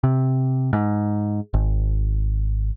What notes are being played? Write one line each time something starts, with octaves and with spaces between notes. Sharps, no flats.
C3
G#2
G#1